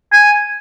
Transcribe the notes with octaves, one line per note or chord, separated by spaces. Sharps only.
G#5